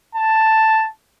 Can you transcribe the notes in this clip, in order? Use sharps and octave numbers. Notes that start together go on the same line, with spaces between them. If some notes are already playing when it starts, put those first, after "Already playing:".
A5